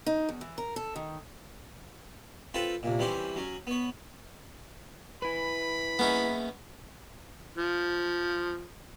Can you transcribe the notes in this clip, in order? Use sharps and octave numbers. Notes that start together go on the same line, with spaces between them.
D#4
E2
E3
A#4
A4
D#3
C4 F4 A4 B4
C2 A#2
E3 G3 C4 C#4 C5
F#3 C#4
B3 C#5
E4 B4 B5
A#3 B3 C#4 D#4 G#4 E5
F3